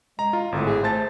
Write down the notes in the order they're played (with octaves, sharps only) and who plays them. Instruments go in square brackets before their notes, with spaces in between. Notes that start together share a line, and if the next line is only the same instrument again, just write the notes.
[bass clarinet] G#3 [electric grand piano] A#5
[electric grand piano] F4
[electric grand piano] G#1 A2 [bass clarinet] D3
[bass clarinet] G#4
[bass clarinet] A3 [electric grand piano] C5 A5 A6